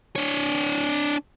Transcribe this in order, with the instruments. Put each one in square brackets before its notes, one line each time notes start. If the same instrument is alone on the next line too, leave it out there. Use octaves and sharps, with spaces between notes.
[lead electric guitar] D4 C#5